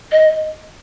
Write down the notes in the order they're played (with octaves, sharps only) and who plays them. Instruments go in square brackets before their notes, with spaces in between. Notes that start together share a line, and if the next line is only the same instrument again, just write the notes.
[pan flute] D#5